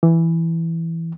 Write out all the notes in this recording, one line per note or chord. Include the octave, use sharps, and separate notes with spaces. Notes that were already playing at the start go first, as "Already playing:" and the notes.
E3